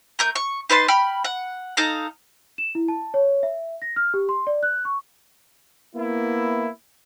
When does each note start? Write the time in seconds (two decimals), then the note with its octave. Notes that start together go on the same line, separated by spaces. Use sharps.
0.19 A3 A#4 G6
0.35 C#6
0.69 D#4 B4 A5 C6
0.88 G5 B5 F6
1.24 F#5
1.77 D#4 A4 F5 A#5
2.58 E7
2.75 E4
2.88 A5
3.14 C#5
3.43 E5
3.82 A#6
3.96 F6
4.14 G4
4.29 C6
4.47 D5
4.63 F#6
4.85 C#6
5.96 A#3 B3 E4